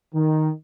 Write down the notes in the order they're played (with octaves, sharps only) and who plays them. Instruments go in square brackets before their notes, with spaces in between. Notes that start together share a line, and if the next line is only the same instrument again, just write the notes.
[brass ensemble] D#3